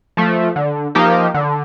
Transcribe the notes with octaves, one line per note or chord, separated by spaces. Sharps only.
F3 A3
D3
F3 A#3 D#4 G4
D3